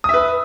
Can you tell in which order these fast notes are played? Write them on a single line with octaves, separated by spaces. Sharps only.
D#6 E5 B4